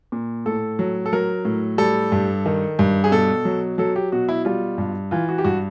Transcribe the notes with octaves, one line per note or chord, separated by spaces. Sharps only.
A#2
A2 A4
F#3
A4
F#3 A#4
A2
G3 A4
G2
D#3
G2
G#4
B2 A4
F#3
F#3 A4
G4
B2 F#4
E4
G3 F4
G2
E3 F4
F#4
G4
G2 F#4